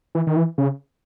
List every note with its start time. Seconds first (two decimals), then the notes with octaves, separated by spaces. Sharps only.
0.15 E3
0.27 D#3
0.37 E3
0.58 C#3